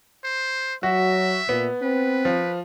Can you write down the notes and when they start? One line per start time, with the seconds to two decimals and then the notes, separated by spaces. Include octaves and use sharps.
0.24 C5
0.83 F#3 F#4 E5
1.49 A#2 B3
1.82 C4 B4
2.25 F3